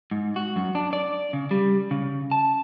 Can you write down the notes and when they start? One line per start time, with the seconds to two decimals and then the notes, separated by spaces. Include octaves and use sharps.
0.11 G#2
0.36 F#4
0.56 F#2
0.75 D4
0.93 D5
1.33 C#3
1.51 G3
1.91 C#3
2.31 A5